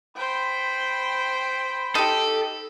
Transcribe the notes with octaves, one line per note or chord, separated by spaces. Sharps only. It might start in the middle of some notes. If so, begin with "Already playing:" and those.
C5 G5 B5
D#4 G4 A4